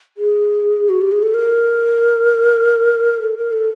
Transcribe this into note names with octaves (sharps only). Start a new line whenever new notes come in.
G#4
F#4
G4
G#4
A4
A#4
A4
A#4
A4